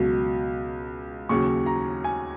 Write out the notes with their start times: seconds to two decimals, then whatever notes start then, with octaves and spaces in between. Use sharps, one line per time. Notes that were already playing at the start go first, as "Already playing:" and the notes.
Already playing: C#2 B2 F#3
1.29 D#2 C#3 F#3 C#6
1.66 A#5
2.04 G#5